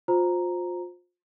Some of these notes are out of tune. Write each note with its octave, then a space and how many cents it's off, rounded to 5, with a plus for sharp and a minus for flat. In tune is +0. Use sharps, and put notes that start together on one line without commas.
F4 +30 C5 +0 A#5 +0